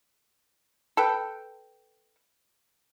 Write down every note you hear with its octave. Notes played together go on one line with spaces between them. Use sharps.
A4 B4 G5